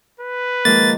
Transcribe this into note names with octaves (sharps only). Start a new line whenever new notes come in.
B4
D#3 F3 G#3 A#3 A6